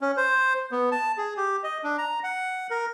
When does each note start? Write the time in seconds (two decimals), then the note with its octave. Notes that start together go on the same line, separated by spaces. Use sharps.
0.01 C#4
0.17 C5
0.72 B3
0.92 A5
1.17 G#4
1.37 G4
1.63 D#5
1.84 D4
1.98 A#5
2.24 F#5
2.70 A#4